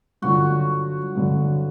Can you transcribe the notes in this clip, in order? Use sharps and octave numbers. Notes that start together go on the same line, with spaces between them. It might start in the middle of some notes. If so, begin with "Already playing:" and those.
G2 D3 F#3 F#4
G2 D3 F#3